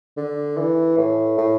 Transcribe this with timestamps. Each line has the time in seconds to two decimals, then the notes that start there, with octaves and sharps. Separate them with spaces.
0.17 D3
0.57 E3
0.97 A2
1.38 A2